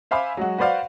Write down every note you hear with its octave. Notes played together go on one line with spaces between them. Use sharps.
C5 E5 F5 G#5 B5 D6
F#3 G#3 F#4
F#4 B4 C5 D5 F5 F#5